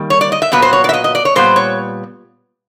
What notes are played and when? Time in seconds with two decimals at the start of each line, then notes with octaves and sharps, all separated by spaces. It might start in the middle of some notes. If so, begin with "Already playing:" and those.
Already playing: D#3 G3 A#3
0.10 C#5
0.21 D5
0.32 D#5
0.42 E5
0.52 A#2 F#3 B3 B4
0.62 C5
0.73 C#5
0.84 D5
0.89 E5
0.93 D#5
1.04 D#5
1.15 D5
1.25 C#5
1.36 A#2 G3 B3 C5
1.56 C#5